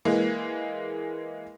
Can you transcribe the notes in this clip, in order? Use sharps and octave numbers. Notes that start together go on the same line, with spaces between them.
E3 G#3 A#3